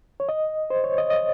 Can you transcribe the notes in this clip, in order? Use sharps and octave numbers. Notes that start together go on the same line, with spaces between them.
C#5
D#5
C5
C#5
D#5
D#5